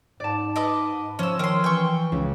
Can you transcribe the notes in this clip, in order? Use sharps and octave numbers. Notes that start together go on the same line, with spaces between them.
G#2 D5 A5
B4 D#5 D6
F3 C#4 C5 E6
D#3 C#4 C6 D7
E3 G5 C#6
C#2